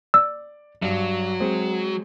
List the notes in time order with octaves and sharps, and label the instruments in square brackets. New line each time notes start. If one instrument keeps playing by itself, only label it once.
[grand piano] D5 [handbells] E6
[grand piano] G2 [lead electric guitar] F#3
[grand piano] G#3 C4